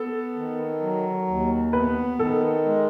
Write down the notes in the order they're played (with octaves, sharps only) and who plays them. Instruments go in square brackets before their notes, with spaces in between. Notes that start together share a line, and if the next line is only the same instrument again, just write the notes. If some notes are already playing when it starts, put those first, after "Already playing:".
Already playing: [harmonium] B3 [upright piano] A4
[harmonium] D#3
F#3
D#2
[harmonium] B3 [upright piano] B4
[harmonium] D#3 [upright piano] A4
[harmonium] G#3